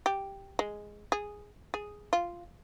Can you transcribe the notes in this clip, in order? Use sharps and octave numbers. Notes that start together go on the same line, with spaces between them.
G4
G#3
G#4
G#4
F4